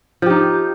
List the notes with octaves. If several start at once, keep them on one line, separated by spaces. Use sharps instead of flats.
F3 D#4 G4